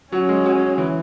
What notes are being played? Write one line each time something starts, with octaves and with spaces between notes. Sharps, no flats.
F#3 C#4
G#3
F#3
E3